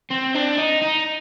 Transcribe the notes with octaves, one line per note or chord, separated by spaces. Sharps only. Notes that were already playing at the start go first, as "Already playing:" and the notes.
C4
D4
D#4
D#4